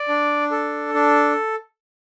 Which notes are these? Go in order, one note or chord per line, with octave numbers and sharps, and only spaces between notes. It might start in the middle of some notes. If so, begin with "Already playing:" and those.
Already playing: D5
D4
A4
D4